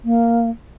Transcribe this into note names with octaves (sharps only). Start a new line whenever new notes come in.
A#3